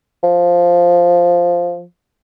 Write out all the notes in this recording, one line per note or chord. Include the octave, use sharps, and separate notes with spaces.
F3